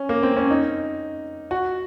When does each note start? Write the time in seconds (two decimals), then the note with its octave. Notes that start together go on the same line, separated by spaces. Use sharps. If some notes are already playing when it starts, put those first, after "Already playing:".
Already playing: C#4
0.09 A#3
0.23 C4
0.37 C#4
0.51 D#4
1.51 F#4